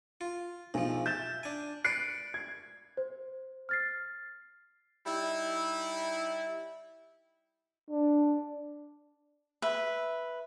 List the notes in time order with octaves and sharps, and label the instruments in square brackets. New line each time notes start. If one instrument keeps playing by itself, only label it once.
[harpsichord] F4
[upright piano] B1 [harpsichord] G#2 F3
[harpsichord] E5 [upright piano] G6 A6 E7
[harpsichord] D4 G#5
[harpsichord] B4 D5 [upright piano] F#6 C7 C#7
[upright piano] G#6
[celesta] C5
F6 A6 C7
[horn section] G3 D#4 E4
[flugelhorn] D4
[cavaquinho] B4 E5